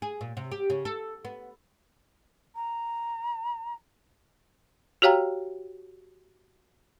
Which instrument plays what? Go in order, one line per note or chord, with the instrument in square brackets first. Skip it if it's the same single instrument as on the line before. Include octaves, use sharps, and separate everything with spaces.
[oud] G#4
A#2
C3
G4
C#3
A4
B3
[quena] A#5
[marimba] F#4 G4 C#5 F5 G5 A#5